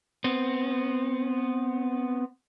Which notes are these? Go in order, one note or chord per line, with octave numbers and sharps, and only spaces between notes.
B3 C4